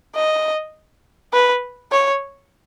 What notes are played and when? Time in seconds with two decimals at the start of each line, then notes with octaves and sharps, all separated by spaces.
0.15 D#5
1.34 B4
1.92 C#5